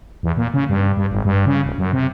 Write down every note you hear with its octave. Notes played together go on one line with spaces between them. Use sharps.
E2
A#2
C#3
G2
G2
G#1
G2
C#3
D1
F#2
C3